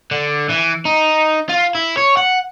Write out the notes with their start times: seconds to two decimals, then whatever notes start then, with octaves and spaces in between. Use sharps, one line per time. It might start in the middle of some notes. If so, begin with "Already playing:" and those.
0.11 D3
0.50 E3
0.85 D#4
1.49 F4
1.75 E4
1.97 C#5
2.17 F#5